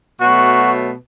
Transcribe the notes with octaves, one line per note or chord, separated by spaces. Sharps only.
B2 F#3 A3 F#4